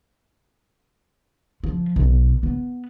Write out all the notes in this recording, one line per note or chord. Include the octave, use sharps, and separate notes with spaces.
F3
B1
B3